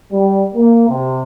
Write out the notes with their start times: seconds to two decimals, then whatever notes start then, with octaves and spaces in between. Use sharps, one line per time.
0.11 G3
0.55 A#3
0.88 C3